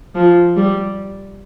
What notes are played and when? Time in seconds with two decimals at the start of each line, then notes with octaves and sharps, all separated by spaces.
0.15 F3
0.57 G3